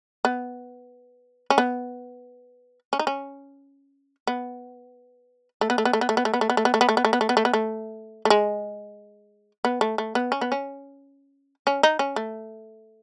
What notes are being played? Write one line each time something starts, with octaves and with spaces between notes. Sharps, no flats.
B3
C#4
B3
C#4
D#4
C#4
B3
A3
B3
A3
B3
A3
B3
A3
B3
A3
B3
A3
B3
A3
B3
A3
B3
A3
B3
A3
B3
A3
B3
A3
B3
A3
A3
G#3
B3
A3
A3
B3
C#4
B3
C#4
C#4
D#4
C#4
A3